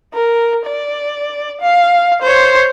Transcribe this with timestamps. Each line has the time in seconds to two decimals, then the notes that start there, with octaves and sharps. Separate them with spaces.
0.14 A#4
0.66 D5
1.61 F5
2.22 C5 C#5